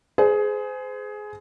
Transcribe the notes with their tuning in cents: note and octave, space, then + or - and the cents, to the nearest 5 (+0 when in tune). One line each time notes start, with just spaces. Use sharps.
G#4 +15 C5 -35